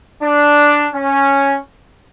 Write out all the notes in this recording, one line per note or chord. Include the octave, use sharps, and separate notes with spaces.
D4
C#4